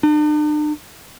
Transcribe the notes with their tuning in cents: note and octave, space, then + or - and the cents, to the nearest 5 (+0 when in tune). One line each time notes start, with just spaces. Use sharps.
D4 +45